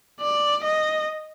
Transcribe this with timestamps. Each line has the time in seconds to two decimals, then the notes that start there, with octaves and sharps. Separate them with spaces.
0.21 D5
0.64 D#5